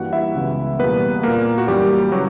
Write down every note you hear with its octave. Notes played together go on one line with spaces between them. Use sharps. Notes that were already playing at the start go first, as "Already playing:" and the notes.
Already playing: G2 E3 G3 A#3 F#4 F#5
E4 E5
C#2 C#3 E3 B3
E2 B2 G3 A#3 B3 B4
A#2 A#3 A#4
F#4
F#2 E3 G3 A#3 G4
C#3 E3 F#3 A#3 F#4